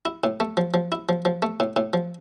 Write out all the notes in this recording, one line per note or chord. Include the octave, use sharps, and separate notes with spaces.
E4
A2
A3
F3
F3
E4
F3
F3
A3
A2
A2
F3